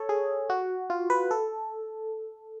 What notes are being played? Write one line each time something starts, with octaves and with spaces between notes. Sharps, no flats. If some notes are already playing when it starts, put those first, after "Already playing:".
Already playing: A4 C#5
G#4
F#4
F4
B4
A4